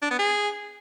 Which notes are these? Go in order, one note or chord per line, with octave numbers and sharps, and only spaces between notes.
D4
B3
G#4